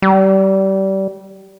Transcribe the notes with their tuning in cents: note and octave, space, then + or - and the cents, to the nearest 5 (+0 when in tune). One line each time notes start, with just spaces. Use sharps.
G3 -25